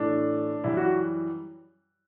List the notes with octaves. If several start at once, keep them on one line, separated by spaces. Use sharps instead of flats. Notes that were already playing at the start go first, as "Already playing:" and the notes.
Already playing: A2 E3 A3 D4
F#2 E3 G3 E4
F#4